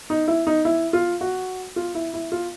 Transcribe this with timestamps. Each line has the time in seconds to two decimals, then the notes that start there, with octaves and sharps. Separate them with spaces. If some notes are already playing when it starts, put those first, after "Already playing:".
0.10 D#4
0.28 E4
0.47 D#4
0.65 E4
0.93 F4
1.21 F#4
1.76 F4
1.95 E4
2.14 E4
2.32 F4